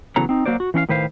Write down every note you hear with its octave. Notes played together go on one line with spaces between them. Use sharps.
C#3 E3 F#3 B3 A4 A#5
C4 D#4
F#3 A#3 F#4 C5 D5
F#4
E3 C#4 D4 F5
A2 D#3 B4 C5 F5